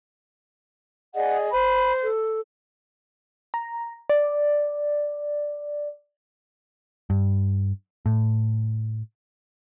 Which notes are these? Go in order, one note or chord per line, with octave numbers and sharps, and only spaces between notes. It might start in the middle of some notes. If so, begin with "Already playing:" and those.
G#4 D5 D#5 F#5
C5 B5
A4
A#5
D5
G2
A2